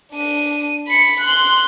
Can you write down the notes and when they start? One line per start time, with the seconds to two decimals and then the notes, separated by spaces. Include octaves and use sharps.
0.12 D4 D#7
0.87 B5 C#7
1.20 C6 F#6